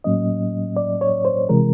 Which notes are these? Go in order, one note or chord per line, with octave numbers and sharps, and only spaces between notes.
A2 F#3 A#3 C#4 D#5
D5
C#5
C5
C3 E3 G#3 A#4